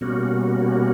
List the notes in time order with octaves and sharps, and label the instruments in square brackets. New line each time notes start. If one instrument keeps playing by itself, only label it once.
[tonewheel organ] B2 G3 A#3 C#4 F#4